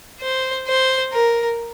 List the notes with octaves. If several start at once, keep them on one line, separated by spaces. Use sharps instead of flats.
C5
C5
A#4